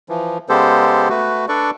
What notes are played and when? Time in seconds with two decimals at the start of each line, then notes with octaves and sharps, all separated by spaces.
0.09 E3 F3
0.49 C#3 G#3 B3 G4 A4 C5
1.10 A3 F#4 B4
1.49 D4 A4 B4 D5 C#6